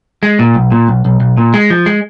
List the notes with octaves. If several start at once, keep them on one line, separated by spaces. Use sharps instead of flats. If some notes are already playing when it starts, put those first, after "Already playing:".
G#3
A#2
B1
A#2
B1
B1
B1
A#2
G#3
F3
G#3